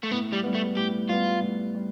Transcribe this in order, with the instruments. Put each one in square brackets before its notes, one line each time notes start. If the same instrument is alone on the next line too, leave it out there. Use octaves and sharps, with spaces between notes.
[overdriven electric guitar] A3
[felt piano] A2 [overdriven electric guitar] B3
[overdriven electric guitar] G3
[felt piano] G3 B3
[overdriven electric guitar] A3
[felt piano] A2 [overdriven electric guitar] G4
[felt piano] G3 B3 [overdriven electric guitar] F4
[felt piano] A2
G3